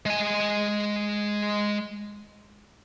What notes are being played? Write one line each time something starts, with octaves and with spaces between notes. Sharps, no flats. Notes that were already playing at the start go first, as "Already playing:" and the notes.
G#3 G#5